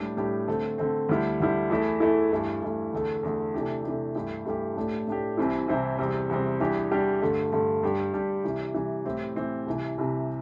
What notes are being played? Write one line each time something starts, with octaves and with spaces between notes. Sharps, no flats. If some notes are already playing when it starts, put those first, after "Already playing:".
Already playing: A2 G3 D4 G4
A2 G3 D4 G4
D3 A3 C4
D3 A3 C4
D2 D3 G3 E4
D2 D3 G3 E4
E2 E3 A3 E4
E2 E3 A3 E4
G2 E3 A3
G2 E3 A3
E2 D3 A3
E2 D3 A3
C3 E3 A3 D4 G4
C3 E3 A3 D4 G4
G2 E3 A3 E4 G4
G2 E3 A3 E4 G4
A2 A3 D4 G4
A2 A3 D4 G4
C2 C3 E3 C4 E4
C2 C3 E3 C4 E4
E2 C3 G3 C4
E2 C3 G3 C4
E2 E3 G3 D4 G4
E2 E3 G3 D4 G4
G2 D3 A3
G2 D3 A3
G2 G3 D4 G4
G2 G3 D4 G4
C3 E3 G3
C3 E3 G3
A2 E3 C4 G4
A2 E3 C4 G4
C2 C3 E3
C2 C3 E3